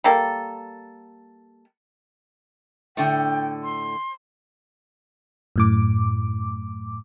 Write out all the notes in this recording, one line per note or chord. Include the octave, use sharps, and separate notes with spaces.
G3 A#3 A4
A2 D3 G5
C6
F#2 A2 D6